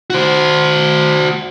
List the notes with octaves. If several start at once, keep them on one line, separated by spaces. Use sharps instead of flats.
F#4 C5